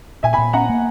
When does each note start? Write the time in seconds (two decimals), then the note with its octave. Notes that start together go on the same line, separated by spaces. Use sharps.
0.23 A#2 E5 G#5
0.33 G#5 B5
0.38 A#2
0.53 C#4 F#5 A#5
0.69 A#3